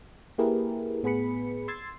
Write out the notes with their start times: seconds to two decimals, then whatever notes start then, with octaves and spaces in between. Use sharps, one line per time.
0.38 A#3 E4 G4 G#4 A#4 B4
1.03 A2 B3 G#4 B4 B5 C#7
1.68 C6 E6 G#6 A6 C7